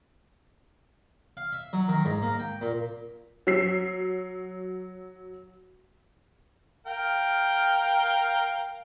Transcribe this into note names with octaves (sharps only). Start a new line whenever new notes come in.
F5
E5
F#3
D#3
G#2
A#3
G5
A#2
F#3 E6 B6 C7
A#4 F5 G5